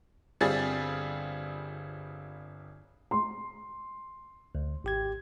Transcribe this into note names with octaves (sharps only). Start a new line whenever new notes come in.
G1 G3 C4 F4 G#4 A6
C6
D2
G#1 G4 G#6